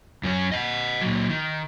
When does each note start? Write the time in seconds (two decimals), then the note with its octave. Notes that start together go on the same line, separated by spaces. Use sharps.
0.23 F#2 C#4
0.52 D#5 F#5
1.01 A#2 F#3
1.29 D#3